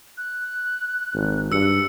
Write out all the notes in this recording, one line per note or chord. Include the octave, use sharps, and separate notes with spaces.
F#6
G#1
G2 E6 C#7